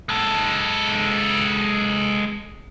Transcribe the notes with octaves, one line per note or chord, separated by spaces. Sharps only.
G#3 A4